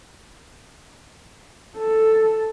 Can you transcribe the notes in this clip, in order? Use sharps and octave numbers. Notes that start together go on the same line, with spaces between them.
A4